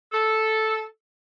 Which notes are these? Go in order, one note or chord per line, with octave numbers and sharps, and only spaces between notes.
A4